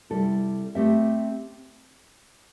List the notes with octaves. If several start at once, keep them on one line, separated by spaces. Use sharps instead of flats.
C3 G3 E4 A4
A3 C4 G4 E5